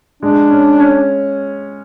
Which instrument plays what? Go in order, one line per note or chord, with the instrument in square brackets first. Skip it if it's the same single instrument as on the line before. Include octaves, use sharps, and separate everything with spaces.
[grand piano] G#3 [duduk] D4
[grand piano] C#4
C#4